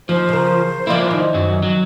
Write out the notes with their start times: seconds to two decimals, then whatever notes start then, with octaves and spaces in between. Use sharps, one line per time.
0.09 D#2 F3 C5
0.29 C#3 A#4
0.87 F3 A#3 E4 F4 D5
1.11 D#3
1.34 F#2 F#3
1.63 F#3